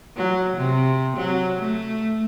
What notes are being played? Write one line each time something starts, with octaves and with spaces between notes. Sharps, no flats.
F#3
C3
F#3
A3